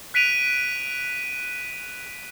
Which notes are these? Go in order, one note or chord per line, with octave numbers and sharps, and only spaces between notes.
F#6 B6 D7 D#7 F7